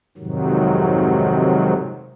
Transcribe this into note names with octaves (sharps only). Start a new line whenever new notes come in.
F2 G#2 C3 D#3 F#3